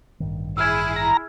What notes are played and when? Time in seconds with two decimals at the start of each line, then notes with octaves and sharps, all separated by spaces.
0.20 A1 G2 D#3
0.57 E4 G#4 E6 F6 G#6
0.96 A#5